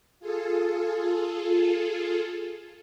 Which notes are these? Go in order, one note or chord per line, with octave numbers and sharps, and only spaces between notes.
F4 G#4 A4